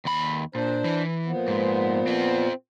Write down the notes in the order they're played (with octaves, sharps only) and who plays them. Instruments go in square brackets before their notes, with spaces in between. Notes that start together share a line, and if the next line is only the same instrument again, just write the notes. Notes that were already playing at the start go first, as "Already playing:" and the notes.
[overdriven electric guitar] D#2 B5
[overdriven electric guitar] A#2 [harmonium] D4 C5
[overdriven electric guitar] E3
[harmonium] A#2 F3 B3
[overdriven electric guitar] G#2
C4 F4